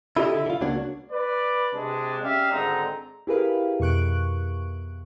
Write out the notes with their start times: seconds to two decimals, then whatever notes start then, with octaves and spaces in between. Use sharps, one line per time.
0.17 E4 F4 G4 A4 D#5
0.32 D3 E4
0.46 D3 F4
0.61 C#2 A#3 D4 F#4 C#5
1.12 B4 D5
1.74 C3 G#3 D4
2.22 C#4 G4 D5 E5 F5
2.51 G#1 D3 G#3 C4 D#4 A#5
3.27 E4 G4 G#4 A#4 B4 F5
3.80 F2 B2 C#6 F#6 D7